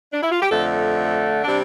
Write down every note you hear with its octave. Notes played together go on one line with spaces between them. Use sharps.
D4
E4
F4
G4
F2 D3 A3 A4
C3 G3 D4